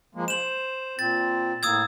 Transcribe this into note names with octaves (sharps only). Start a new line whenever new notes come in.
F3 G#3 A#3
C5 E7 F#7
A#2 C4 A6
A2 A#3 D#6 E6 G#6